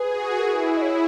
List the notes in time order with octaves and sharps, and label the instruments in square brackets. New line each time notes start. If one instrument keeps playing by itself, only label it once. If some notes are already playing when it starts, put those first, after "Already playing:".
Already playing: [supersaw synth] G#4 [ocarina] B4
[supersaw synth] F#4
[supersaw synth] E4 [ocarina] A#4
[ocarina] B4
D#5
C#5